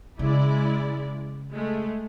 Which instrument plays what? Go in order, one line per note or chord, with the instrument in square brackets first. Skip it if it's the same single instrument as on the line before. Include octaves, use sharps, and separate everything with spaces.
[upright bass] C#3 [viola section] G#3 E4 D5
[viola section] G#3 A3